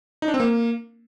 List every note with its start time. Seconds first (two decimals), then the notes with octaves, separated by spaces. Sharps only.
0.22 D#4
0.28 D4
0.34 C4
0.40 A#3